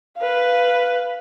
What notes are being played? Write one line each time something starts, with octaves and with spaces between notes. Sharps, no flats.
B4 F5